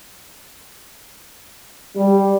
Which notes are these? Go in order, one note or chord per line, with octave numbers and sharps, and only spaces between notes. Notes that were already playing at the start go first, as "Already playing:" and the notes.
G3